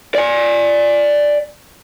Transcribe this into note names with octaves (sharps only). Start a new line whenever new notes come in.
D5 G#5